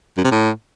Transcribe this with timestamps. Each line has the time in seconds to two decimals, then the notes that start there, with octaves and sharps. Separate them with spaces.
0.17 F#2
0.24 C3
0.31 A2